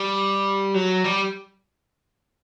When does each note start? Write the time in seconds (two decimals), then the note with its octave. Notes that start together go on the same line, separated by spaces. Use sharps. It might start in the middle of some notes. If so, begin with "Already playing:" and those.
Already playing: G3
0.74 F#3
1.05 G3